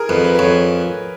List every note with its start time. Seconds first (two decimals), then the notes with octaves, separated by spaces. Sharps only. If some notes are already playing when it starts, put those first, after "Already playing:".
Already playing: G#4 A#4
0.09 F2 B4
0.24 B4
0.34 B4
0.39 F2 C#5